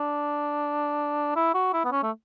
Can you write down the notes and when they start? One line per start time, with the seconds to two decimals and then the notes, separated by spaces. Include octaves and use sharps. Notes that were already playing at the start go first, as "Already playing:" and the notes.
Already playing: D4
1.36 E4
1.54 F#4
1.73 E4
1.84 B3
1.91 C#4
2.03 A3